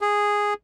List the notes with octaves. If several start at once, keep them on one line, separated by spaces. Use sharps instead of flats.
G#4